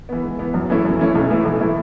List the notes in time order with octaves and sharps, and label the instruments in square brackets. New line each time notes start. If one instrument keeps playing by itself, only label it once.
[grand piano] E3 B3
G#2
E3 B3
F#2
E3 A3 C#4 E4
F#2
E3 A3 C#4 E4
B1
A2 E3 A3 E4
B1
A2 E3 A3 E4